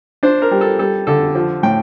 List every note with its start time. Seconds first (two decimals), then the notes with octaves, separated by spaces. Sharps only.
0.23 D4 C5
0.42 A#4
0.51 G3
0.61 A4
0.79 G3 A4
1.07 D3 A4
1.35 F3
1.63 A2 G5